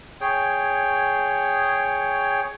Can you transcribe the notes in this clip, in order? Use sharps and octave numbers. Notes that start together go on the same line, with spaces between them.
G#4 C#5 G5